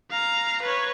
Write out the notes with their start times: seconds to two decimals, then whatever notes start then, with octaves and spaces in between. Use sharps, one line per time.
0.11 F5 A#5
0.62 B4 C#5